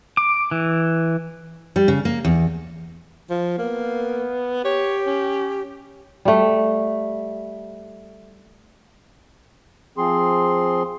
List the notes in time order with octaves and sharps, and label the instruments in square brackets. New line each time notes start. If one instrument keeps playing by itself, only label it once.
[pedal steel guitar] D6
E3
[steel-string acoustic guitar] G3
C#3
A#3
E2
[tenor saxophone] F3
[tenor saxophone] A#3 [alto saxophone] B3
[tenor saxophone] G4 [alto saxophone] C#5
[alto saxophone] C#4
[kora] G3 A3
[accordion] F3 C4 G#4 C6